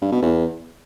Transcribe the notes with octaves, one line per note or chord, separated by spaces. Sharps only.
G2
B2
E2